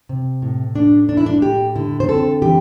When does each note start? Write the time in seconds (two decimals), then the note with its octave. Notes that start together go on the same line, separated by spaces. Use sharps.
0.09 C3
0.42 A2
0.75 A3 D4
1.09 A2 D4
1.17 E4
1.26 D4
1.42 A2 G4
1.76 D3 E4
2.00 C5
2.09 C4 A4
2.42 E3 G4